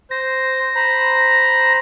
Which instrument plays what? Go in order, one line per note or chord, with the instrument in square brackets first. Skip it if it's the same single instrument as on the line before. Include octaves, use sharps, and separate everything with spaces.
[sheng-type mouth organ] C5 [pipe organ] A#6
[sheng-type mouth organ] C5 A#5 B5